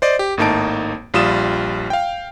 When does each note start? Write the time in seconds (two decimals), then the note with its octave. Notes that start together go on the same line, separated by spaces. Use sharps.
0.02 C5 D5 D#5
0.19 G4
0.37 G#1 A2 A#3 D#4 A5 D7
1.14 A#1 G3 F4 D#6 E7
1.90 F5 G5